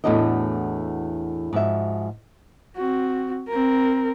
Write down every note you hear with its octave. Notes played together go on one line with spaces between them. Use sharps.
E2 A2 A3 D4 F#4 D#5
G#2 F3 F#4 E5
C4 F#4
C4 A#4